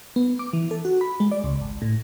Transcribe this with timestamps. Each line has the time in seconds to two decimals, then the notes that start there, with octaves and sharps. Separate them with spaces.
0.16 B3
0.39 D6
0.53 E3
0.71 A4
0.85 F#4
1.01 B5
1.20 G#3
1.32 D5
1.44 C#2
1.61 G#1
1.82 A2